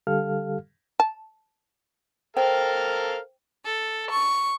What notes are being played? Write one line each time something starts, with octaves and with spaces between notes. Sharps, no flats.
D3 G3 G4 A4 F5 F6
A5
A4 A#4 C5 F5 G5
A4
C#6